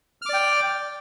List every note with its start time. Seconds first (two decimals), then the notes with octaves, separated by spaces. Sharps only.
0.22 F6
0.26 D6
0.30 D5
0.33 G5